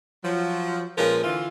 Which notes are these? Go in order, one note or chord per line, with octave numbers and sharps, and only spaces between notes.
F3 F#3
A#2 F3 G#3 C#4 A#4 B4
D3 E3 F4